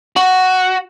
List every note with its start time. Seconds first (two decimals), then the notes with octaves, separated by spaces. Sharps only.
0.17 F#4